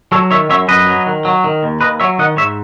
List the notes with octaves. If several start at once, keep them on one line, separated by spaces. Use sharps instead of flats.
F#3 A4 C#5
D#3 C#5 E5
F#2 C#5 E5
F#2 B4 D#5
F#3
D#3
F#3
D#3
D#2
D#2 B4 D#5
F#3 C#5 E5
D#3 D#5 F#5
G#2 C#5 E5